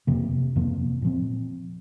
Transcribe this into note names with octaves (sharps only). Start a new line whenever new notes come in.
F2 C3 F3 A#3
F2 C3 F3 A#3
A#2 F3 C4